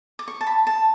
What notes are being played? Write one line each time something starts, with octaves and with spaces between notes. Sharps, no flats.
D6
C#6
A5
B5
A5